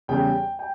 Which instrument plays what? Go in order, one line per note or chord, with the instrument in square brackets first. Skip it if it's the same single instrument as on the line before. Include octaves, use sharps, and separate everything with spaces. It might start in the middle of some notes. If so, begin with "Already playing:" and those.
[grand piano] E2 C#3 G3 G5
G5